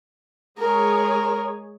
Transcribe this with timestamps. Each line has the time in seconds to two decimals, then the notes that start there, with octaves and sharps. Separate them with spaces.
0.58 G#3 G#4 A#4 C#5